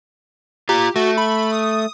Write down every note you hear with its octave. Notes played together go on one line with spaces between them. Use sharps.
F4 G4 A#5
A3 F#4
B5
D#6